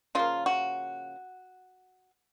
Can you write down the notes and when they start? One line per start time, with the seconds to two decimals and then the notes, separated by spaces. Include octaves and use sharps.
0.15 C#3 F3 A#3 F4
0.46 F#4